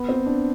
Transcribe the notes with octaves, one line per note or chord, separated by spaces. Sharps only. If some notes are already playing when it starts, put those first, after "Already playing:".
Already playing: B3
C4
D4